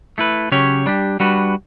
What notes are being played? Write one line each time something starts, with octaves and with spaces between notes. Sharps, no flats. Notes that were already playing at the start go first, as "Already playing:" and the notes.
A3 E4 B4
C#3 F#3 C#4 G4 C#5
G3 D4 G4
G3 D4 F#4 B4